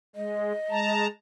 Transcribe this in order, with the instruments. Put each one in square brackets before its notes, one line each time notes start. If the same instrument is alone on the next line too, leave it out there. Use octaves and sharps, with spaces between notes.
[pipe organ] G#3 [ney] D#5
[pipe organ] G#3 A5 A#5